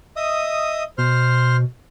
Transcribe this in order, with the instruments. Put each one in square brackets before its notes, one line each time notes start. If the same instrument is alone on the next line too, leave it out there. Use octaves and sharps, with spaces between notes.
[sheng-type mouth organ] D#5 E5 D#6
[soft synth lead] B2 [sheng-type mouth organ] C5 C6 F6